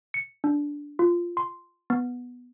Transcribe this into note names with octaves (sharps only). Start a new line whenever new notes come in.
C#7
D4
F4
C6
B3